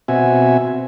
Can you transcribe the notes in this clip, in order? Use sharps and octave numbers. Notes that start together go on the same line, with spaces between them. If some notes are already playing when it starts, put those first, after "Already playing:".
B2 C4 F#4 E5 G#5